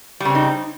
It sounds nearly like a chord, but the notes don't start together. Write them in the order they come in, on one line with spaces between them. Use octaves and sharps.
G3 C#3 C4 D#4